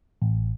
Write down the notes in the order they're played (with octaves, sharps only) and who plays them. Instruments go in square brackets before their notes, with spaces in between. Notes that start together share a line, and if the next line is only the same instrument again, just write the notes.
[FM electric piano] A1